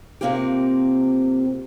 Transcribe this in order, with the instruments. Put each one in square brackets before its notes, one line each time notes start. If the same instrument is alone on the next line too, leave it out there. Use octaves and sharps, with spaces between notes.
[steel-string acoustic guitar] C3 E3 A#3 C4 F4 G4